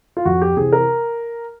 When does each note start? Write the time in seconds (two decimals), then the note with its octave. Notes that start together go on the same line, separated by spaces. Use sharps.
0.17 F4
0.25 F2 F#4
0.42 G4
0.57 C3 E3 G#4
0.73 A#4